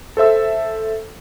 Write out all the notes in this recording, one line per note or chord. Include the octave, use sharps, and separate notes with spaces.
A4 C5 E5 E6